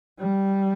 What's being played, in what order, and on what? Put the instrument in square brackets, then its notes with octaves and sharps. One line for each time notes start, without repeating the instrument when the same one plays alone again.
[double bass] G3